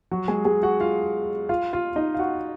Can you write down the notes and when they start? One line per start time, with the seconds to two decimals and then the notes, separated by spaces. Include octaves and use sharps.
0.11 F#3 F#4
0.28 G#3 G#4
0.45 G#3 G#4
0.63 F#4 F#5
0.81 F4 F5
1.49 F4 F5
1.73 F4 F5
1.96 D#4 D#5
2.14 F5
2.19 F#4 F#5